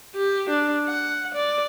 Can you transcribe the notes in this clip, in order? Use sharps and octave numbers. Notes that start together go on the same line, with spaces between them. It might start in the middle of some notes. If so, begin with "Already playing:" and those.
G4
D4
F#5
D5